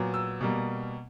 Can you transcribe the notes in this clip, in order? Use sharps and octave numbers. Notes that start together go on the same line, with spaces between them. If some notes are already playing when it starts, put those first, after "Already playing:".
Already playing: A#2 F#3 B3
E6
B2 G3 A#3